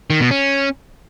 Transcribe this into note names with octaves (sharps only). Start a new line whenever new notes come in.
D#3
B2
C#4